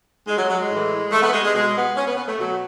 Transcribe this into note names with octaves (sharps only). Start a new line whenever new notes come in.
G#3
F#3
F#3
G#3
A2 E3
A3
B3
G#3
G#3
B2 G#3
B3
C#4
B3
B3
A3
B2 F#3